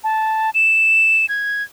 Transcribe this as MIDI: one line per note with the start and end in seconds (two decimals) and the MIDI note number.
0.04 0.50 81
0.54 1.26 100
1.29 1.63 92